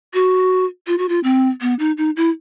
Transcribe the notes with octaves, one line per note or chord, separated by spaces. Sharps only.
F#4
F4
F#4
F4
C4
B3
D#4
D#4
E4